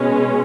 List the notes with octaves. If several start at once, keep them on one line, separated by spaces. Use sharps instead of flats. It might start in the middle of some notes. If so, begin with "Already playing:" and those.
Already playing: B2 G#3 C#4